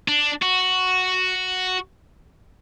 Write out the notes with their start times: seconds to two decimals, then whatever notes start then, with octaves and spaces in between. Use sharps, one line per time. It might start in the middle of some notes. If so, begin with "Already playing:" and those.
0.08 D4
0.42 F#4